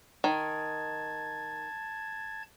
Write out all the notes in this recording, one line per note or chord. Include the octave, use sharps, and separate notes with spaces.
D#3 A5 G#6